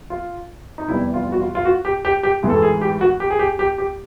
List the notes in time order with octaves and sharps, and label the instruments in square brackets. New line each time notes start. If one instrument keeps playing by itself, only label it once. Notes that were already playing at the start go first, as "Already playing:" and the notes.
[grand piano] F4
D#4
F1 E2 C3 E3 G3 E4
F4
F#4
F4
F4
F#4
G4
G4
G4
A1 G#2 E3 G#3
A4
G#4
G4
F#4
G4
G#4
G4
G4
G4